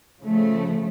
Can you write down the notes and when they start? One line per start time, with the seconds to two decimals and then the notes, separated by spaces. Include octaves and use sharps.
0.22 C#3 F3 A3